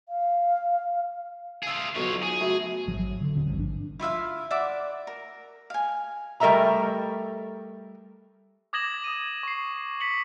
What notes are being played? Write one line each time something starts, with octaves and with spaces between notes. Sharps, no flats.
F5
F4 G#4 E5 A5
B1 F2 F4 C#5
G#4
F#2 C#3 A3
G#1 F3 F#3
F#3
D3
D#1 D3 C4
G#1 G2 F3
D4
E4 F4 E5 F5
D5 E5 F#5 D6
A#4
F5 G#5
G3 A3 A#4 D#5 E5 A#5
D6 D#6 G#6 A#6 E7 F#7
D#6 D#7
C#6 C7
B6 C#7 F#7